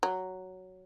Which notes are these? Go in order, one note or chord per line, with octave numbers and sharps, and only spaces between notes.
F#3